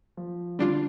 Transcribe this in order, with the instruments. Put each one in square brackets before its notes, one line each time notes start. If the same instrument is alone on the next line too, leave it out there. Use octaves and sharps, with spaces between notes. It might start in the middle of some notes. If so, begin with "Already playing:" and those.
[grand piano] F3
[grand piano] D3 [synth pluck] G3 D4 F4